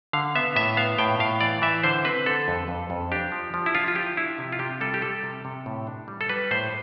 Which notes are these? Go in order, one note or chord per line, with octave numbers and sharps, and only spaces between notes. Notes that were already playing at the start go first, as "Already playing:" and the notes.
D3 F5
B3 E5
A2 E5
B3 F5
A2 G5
A2 F5
E3 D5
E3 E5
D3 C5
C4 B4
D3 A4
F2
F2
F2
D4 G4
F3
F3
E4
D4 F4
F4
F3 G4
D4 E4
C3
F4
C3 G4
G3 A4
G4
G3 A4
C3
C3
A2
D4
G3
A4
G3 B4
A2 C5